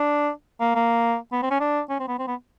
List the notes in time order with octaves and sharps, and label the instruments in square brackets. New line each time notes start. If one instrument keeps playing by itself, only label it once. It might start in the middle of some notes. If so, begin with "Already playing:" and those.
Already playing: [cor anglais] D4
A#3
A#3
B3
C4
C#4
D4
C#4
C4
B3
C4
B3